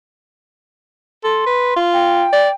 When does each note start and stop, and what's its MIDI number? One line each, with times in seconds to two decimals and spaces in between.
1.24 1.43 69
1.24 1.81 84
1.46 1.71 71
1.76 2.25 65
1.93 2.53 79
2.32 2.49 74